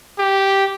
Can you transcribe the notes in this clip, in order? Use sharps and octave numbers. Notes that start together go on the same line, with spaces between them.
G4